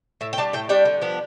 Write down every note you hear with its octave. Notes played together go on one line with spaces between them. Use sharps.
A2 E5
G5
G3 D4 A5
A2 G5
G3 D4 G5
D3
F3 B3 D4